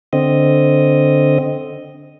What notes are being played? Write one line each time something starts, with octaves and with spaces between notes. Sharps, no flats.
D3 C4 D#5